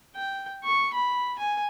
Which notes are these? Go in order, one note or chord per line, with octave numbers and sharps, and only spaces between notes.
G5
C#6
B5
G#5